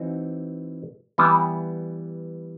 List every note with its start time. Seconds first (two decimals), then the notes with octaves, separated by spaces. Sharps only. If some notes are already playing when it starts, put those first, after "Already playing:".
Already playing: E3 C4 D#4 F#4
1.18 E3 G3 B3